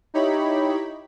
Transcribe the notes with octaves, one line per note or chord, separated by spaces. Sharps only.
D#4 E4 G4 C#5 B5